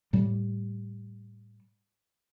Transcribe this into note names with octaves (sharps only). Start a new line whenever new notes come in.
A2 G3